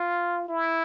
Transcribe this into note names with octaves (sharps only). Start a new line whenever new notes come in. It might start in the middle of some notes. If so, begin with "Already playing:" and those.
Already playing: F4
E4